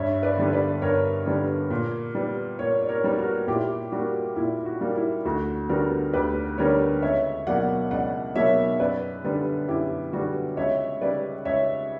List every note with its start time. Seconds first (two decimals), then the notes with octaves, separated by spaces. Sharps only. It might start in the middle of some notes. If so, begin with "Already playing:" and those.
Already playing: G2 C#5 E5
0.23 B4 D5
0.37 D3 G3 B3
0.53 B4 D5
0.82 G2 A#4 C#5
1.26 D3 G3 B3
1.70 A#2
2.15 G3 B3
2.59 A#2 A#4 C#5
2.82 D5
2.89 A#4 C#5
3.04 G3 B3
3.18 F#4 A#4
3.48 A#2 E4 G4
3.92 G3 A#3 F#4
4.36 A#2 E4
4.66 F#4
4.81 G3 A#3
4.96 E4
5.25 D2 F#4
5.69 D3 G3 B3 F#4 A#4
6.13 D2 G4 B4
6.58 D3 G3 B3 A#4 C#5
7.02 C#2 C#5 E5
7.46 B2 F#3 A#3 D5 F#5
7.91 C#2 D5 F#5
8.35 B2 F#3 A#3 C#5 E5
8.79 F#2 B4 D5
9.24 D3 G3 B3
9.68 F#2 E4 G4
10.12 D3 G3 B3 F#4
10.57 C#2 C#5 E5
11.01 C#3 G3 B4 D5
11.45 C#2 C#5 E5